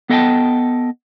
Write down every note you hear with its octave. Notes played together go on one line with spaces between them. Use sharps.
B3 A4 D#5 F#5 G5 A5